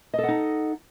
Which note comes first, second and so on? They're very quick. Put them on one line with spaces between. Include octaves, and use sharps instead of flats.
D#5 A4 F#5 D#4